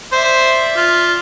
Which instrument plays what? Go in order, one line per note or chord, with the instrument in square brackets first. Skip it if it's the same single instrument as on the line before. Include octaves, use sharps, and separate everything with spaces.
[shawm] C5 [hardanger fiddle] D5 E5
[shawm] F4